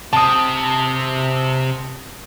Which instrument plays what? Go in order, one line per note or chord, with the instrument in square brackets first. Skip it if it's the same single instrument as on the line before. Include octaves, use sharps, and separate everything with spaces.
[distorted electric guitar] C3 C4 [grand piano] A5 D#6